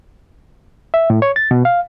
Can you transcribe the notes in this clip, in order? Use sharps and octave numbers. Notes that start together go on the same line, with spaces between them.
E5
A2
C#5
A6
B2
F5